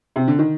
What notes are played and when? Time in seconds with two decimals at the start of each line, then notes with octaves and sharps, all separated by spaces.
0.16 C3
0.28 D3
0.39 D#3